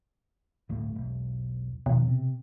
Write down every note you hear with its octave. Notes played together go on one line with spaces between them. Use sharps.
D1 G1 A3
E1 B1
E2 B2 D#3 F3
C3